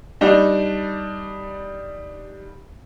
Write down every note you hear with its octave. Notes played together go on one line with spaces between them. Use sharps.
G3 D4 D#4